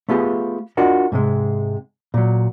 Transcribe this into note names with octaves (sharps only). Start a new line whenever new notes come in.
A3 B3 F4 G4 G#4
D4 F4 F#4 A#4 D#5
G#2 C3 G#3
A#2 F#3